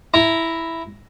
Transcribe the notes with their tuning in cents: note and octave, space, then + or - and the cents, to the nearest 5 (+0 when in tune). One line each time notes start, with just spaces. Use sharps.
E4 +0 A#5 +0